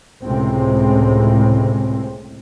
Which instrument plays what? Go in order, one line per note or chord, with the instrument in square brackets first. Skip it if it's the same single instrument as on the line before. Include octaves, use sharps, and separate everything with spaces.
[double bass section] C#2 A2 C3 G#3 C4